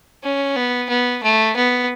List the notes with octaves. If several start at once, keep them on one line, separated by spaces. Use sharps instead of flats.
C#4
B3
B3
A3
B3